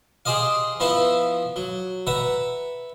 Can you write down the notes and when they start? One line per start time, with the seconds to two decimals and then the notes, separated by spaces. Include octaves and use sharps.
0.25 G4 G#4 C5 D#5 F5
0.80 F3 B3 E4 F4 B4 E5
1.56 F#3
2.07 B4 E5 F#5 A#5